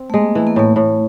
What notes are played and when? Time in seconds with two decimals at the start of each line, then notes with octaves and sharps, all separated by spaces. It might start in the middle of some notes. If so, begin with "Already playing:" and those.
Already playing: C4
0.10 A3
0.14 G#3 A#3
0.35 E3 A3
0.47 A#3
0.56 A2 A3
0.76 A2